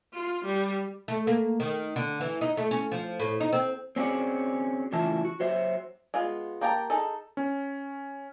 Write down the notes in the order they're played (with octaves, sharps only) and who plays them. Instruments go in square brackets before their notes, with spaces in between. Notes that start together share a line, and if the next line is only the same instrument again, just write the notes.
[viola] F4
G3
[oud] A3
A#3
D#3
D3
E3
D#4
A3
C#4
F3
A2
D#4
C4
[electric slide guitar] C4 C#4 F#4 G#4 D5
A2 C#3 E3 F4 E5 A5
F#4
F#3 C5 E5
[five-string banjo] G#3 B3 F4
A#3 G4 G5 A5 A#5
D#4 G#4 A4
[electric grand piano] C#4